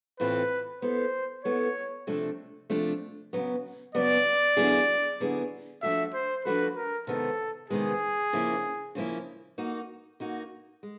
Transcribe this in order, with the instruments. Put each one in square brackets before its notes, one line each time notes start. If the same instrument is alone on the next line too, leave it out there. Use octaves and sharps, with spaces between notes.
[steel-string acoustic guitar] A2 E3 A3 C4 F4 [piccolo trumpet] B4
[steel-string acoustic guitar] B3 E4 A4 [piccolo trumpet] C5
[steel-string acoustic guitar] B3 E4 A4 [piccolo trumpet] C#5
[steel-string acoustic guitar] C3 F3 A3 D4
C3 F3 A3 D4
C#3 F#3 B3
[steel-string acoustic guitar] C#3 F#3 B3 [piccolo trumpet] D5
[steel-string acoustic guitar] D3 F#3 B3 E4 G#4
D3 F#3 B3 E4 G#4
[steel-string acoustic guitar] F3 A3 D4 F#4 A4 [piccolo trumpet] E5
[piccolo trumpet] C5
[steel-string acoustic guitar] F3 A3 D4 F#4 A4 [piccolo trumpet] B4
[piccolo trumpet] A#4
[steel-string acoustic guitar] C3 D#3 G#3 B3 [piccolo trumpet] A4
[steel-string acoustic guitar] C3 D#3 G#3 B3 [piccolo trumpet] G#4
[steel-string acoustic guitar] C#3 F3 A#3 C#4 E4
C#3 F3 A#3 C#4 E4
A#3 D#4 F#4
A#3 D#4 F#4
G#3